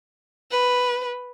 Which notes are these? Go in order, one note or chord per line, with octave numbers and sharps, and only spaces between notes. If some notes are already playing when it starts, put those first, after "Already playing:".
B4